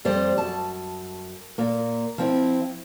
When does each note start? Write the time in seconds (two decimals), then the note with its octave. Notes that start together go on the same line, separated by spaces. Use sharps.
0.05 F2 G3 C5 D5
0.38 F#2 A5
1.58 A#2 A#3
2.18 F3 C4 E4